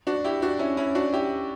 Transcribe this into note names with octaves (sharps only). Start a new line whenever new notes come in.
D4 F#4
E4 G4
D4 F#4
C#4 E4
C#4 E4
D4 F#4
E4 G4